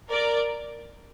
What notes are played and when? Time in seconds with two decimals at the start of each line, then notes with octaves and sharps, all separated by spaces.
0.10 A#4 D5